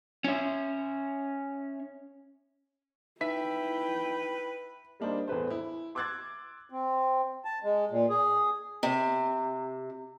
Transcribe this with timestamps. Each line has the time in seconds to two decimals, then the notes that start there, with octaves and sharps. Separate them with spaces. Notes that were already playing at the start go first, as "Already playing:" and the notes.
0.24 C#4 E5
3.21 D#4 E4 B4 E5 G5 B6
5.00 G3 A#3 D4 D#4 C5
5.28 E2 A2 B4 C5
5.50 E4
5.95 C6 D6 E6 F#6 G#6 A6
6.70 C4
7.45 A5
7.64 G#3
7.91 A#2
8.09 G#4
8.83 C3